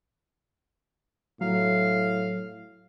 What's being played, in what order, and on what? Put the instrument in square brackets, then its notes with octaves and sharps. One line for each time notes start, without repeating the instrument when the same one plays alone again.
[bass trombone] A2 [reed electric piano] F#3 [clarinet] F5